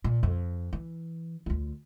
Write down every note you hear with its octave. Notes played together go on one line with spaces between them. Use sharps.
A#2
F2
E3
D2 F4